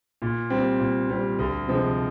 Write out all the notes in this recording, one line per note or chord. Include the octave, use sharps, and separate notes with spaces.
A#2
G3 C4
A#2
G3 C4
D2
C3 F3 G#3